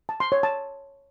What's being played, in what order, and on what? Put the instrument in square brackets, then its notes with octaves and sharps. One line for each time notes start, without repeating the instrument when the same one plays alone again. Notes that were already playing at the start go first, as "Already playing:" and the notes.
[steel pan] A5
C6
C#5
A5